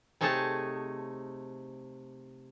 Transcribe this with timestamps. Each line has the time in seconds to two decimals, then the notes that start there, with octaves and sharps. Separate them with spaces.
0.21 C3 A3 D#4 G#4 C#5 A5